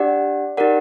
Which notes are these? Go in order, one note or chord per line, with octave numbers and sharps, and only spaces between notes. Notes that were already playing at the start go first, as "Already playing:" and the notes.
Already playing: D4 G4 D5 F#5
D#4 G4 A#4 D5 F#5